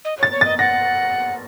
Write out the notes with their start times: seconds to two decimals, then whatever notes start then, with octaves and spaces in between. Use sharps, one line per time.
0.05 D#5
0.19 C#5
0.23 A6
0.32 C#5
0.41 D#5 A6
0.58 F#5 A#6